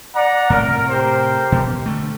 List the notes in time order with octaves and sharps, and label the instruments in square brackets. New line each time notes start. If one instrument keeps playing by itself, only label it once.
[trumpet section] D5 F#5 A#5
[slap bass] A2 C3 A3 [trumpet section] A#4
[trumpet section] G4 A#4 C5
[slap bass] B2
D3 A3